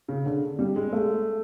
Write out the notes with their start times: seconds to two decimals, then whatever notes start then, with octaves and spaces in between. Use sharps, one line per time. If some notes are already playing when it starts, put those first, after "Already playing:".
0.08 C#3
0.26 D3
0.59 G3
0.76 G#3
0.93 A3